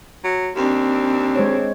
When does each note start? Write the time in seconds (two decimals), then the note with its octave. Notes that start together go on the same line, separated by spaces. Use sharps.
0.24 F#3
0.56 D#2 C4 D4
1.36 G#3 C5 C#5